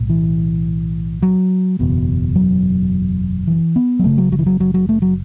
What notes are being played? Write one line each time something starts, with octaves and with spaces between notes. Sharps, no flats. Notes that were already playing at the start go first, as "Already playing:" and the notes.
Already playing: B1 A2
E3
F#3
F#1 E2 B2
F#3
E3
B3
F#3
F#1 F#2 C#3 A3
F#3
F#3
E3
F#3
F#3
F#3
A3
F#3